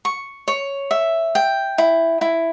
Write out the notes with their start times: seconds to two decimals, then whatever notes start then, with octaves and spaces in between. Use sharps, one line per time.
0.05 C#6
0.48 C#5
0.91 E5
1.35 G5
1.78 E4
2.21 E4